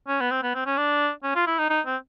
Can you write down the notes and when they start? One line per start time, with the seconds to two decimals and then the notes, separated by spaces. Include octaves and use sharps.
0.08 C#4
0.21 B3
0.31 C4
0.43 B3
0.55 C4
0.66 C#4
0.78 D4
1.23 C#4
1.35 F4
1.47 E4
1.59 D#4
1.70 D#4
1.86 C4